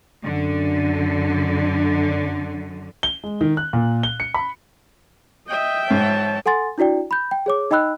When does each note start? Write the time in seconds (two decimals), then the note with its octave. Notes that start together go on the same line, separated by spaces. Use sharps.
0.24 F#2 D3
3.03 G7
3.24 G#3
3.41 D#3
3.57 F#6
3.73 A#2
4.03 G7
4.20 C#7
4.34 B5
5.48 D#5 E5 G5
5.90 G#2 C#5 A5
6.46 A4 F#5 G#5 C6 A6
6.78 D4 E4 F#4 D5 G5
7.11 B5 G6
7.31 G5
7.46 G#4 C#5 D6
7.71 D#4 D#5 G5 B5 E6 F#6